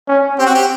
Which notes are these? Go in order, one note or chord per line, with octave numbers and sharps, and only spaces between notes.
C#4
C4 G4
F#4
G4